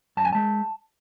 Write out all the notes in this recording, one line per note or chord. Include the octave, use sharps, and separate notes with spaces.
F#2 A5
G#5
G#3 A5